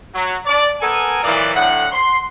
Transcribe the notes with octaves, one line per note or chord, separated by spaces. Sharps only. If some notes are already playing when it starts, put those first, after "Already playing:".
F#3
D5
B3 A4 A#4 G#5
A#2 E3 F#3 A#3 B3 D5
A2 D3 F#3 F#5
C6